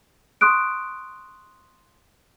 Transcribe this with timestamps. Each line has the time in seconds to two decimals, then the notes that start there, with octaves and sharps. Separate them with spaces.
0.41 C6 C#6 D#6 F#6 D7